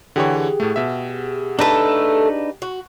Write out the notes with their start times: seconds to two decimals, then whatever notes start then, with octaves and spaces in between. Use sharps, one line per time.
0.16 D3 E3 G4 G#4 C#5 F#5
0.60 A2 A3
0.76 B2 E5
1.59 A3 D4 D#4 A4 B4
2.62 F#4